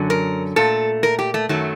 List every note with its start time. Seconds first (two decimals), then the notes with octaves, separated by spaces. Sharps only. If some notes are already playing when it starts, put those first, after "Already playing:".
Already playing: F#2 D3 F#3
0.10 A#4
0.56 A#2 A3 A4
1.03 A#4
1.19 G4
1.34 A3
1.49 F#2 D#3 F#3 A3